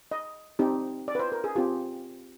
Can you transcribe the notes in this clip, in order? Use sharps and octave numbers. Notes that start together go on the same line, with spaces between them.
D#5
C4 D#4 G4
D5
B4
C5
A#4
G#4
C4 F4 G4